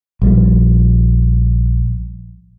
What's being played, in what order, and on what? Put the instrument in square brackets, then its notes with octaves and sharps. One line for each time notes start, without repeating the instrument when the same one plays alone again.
[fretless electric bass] A#1 G3